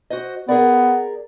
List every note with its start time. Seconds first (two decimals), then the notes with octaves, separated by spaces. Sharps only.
0.10 F#4 C5 D#5
0.49 B3 G#4 A#4 D5